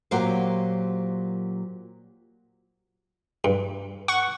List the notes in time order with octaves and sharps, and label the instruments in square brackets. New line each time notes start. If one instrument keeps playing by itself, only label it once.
[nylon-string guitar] A#2 F#3 G4 A#4 C5 F5
[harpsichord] G2
[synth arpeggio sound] F#5 C#6